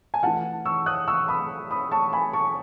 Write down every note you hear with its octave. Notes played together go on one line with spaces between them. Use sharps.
G#5
E3 A3 E4 F#5 A5
C#6 E6
D#6 F#6
C#6 E6
B5 D#6
B5 D#6
A5 C#6
G#5 B5
A5 C#6